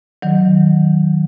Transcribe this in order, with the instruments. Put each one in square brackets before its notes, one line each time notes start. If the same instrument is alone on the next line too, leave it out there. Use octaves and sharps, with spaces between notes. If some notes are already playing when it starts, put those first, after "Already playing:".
[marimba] D#3 F#3